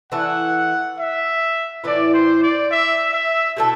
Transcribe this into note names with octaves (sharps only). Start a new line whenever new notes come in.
E3 A3 E4 F#5
E5
A2 E3 B3 E4 D5
C5
D5
E5
E5
B2 A3 E4 A4